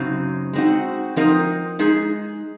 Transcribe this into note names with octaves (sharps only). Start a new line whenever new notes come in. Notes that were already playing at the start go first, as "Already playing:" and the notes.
Already playing: F#2 C#3 F#3 C4 D#4
G#3 C4 D#4 F#4
F3 C4 D#4 A#4 D#5
G#3 D#4 G#4